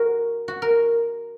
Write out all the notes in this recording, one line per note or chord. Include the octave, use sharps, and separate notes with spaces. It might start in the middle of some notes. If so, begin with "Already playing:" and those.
Already playing: F#4 A#4
F#4
A#4